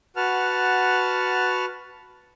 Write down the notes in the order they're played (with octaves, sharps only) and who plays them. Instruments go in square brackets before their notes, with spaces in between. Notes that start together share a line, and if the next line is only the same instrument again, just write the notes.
[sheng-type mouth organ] F#4 B4 F#5 A5 F6